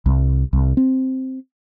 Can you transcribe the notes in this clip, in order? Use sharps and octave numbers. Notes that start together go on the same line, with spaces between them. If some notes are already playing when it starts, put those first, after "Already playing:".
C2
C2
C4